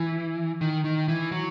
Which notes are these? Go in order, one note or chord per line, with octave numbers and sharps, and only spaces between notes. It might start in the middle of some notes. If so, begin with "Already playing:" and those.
Already playing: E3
D#3
D#3
E3
F#3